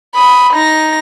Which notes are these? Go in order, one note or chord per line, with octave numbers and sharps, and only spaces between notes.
B5 D#6
D#4 A#6